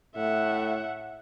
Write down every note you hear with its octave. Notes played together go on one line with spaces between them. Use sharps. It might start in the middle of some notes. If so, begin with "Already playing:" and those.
A2 E5 F#5